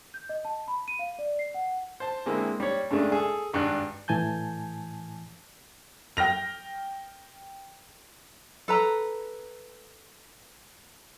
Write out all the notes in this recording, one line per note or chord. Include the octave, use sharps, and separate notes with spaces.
G6
D#5
A5
B5
D#7
F5
D5
C7
F#5
C5 A5
D3 G#3 A#3 C4 E4
G3 C#5
G2 C#3 G#3 A3 D4
G#4 A4
G#1 G2 D4 G5 F#6
A2 E3 G#5 A5 G6
G5 F6 A#6 F7
A4 B4 A#5